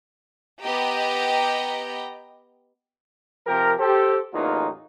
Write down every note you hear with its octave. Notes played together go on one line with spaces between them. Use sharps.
B3 G4 D#5 G5 A#5
C3 F3 G4 A#4
G4 A4 C5
A1 E2 F#3 A#3 D#4 F4